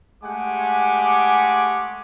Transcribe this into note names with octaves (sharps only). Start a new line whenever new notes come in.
G#3 A3 G4 F#5 G#5 D6